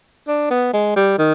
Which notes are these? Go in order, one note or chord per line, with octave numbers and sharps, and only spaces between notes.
D4
B3
G#3
G3
D#3